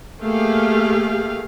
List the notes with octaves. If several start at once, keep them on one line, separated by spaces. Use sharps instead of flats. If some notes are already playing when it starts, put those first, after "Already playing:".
A3 A#3 G4 G#4 F5